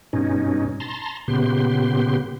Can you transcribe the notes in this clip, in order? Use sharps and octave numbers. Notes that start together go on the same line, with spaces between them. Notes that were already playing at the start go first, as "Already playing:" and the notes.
G2 B2 C#4 D#4
A5 A#5 C6
A#2 C#3 B3 G4 C6